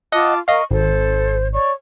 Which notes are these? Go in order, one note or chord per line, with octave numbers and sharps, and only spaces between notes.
F4 D#5 F#5 A5 D6
A#4 D#5 F5 C#6
G#1 A4 C5
C#5 D5 C#6